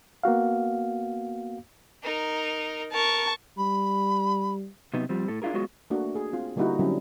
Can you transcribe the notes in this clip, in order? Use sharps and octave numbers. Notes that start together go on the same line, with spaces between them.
A#3 B3 F#4 F5
D#4 A#4
A#4 A5 C#6
G3 B5
C3 F#3 B3 D#4 G4
F3 G3 C4
A2 A4
D4 E4 F4 G#4 A#4
F#3 G#3 B3 F4 F#4 G#4
A3 A#3 D4 F#4
G#4
C4 F4
D3 G3 A#3 D#4 E4 F#4
D3 F#3 G3 C4 C#4 E4